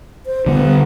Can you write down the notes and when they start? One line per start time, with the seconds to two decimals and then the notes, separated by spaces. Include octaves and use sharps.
0.26 C5
0.46 D3 G3 B3